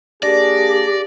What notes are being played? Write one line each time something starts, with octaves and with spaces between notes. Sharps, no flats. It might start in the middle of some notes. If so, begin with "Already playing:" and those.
A#3 D4 G4 G#4 D5 A#6